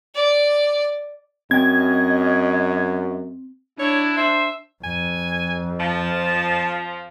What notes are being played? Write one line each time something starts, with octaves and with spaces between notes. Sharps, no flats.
D5
F#2 C4 D#5 G5 G#6
D4 E4 C#5
C5 E5
F2 G#5
F3 A5